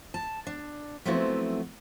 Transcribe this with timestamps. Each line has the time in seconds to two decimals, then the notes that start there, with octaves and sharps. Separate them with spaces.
0.14 A5
0.47 D4
1.05 F3 F#3 A3 B3 C4 E4